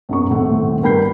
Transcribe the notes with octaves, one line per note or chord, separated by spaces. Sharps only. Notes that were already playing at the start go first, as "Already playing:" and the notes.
B1 F#2 C#6
D#1 B1 A2 A3 C4 F#5
G2 A#4 G5 B5 G6 C7